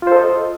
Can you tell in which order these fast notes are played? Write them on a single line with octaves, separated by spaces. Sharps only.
F4 C5 A4 D#5